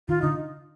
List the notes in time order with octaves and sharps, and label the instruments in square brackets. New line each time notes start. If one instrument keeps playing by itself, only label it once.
[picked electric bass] D#3 [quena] F4
[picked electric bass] D3 [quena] D#4